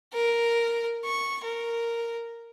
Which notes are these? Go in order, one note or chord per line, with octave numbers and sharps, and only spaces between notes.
A#4
C#6
A#4